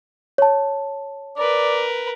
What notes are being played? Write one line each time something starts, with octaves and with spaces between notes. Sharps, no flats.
C#5 A5
A#4 B4 D5